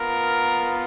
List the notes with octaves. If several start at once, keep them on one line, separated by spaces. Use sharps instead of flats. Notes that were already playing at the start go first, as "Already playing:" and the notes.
Already playing: B3 F4 A#4